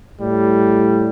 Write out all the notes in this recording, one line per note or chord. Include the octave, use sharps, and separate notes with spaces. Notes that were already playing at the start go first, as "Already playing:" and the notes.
A2 G3